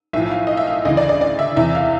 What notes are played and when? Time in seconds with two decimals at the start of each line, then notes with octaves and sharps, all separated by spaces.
0.13 B1 A2 F3 E5
0.31 F5
0.47 D#5
0.57 E5
0.67 F5
0.85 D2 C#3 E3 D#5
0.97 D5
1.09 D5
1.21 D5
1.39 E5
1.56 E2 C3 E3 E5
1.75 F5